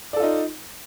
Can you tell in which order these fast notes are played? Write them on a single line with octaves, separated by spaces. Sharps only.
D5 A4 F4 D#4